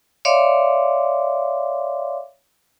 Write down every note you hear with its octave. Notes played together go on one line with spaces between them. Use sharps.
C#5 D5 E5 F5 C6 D6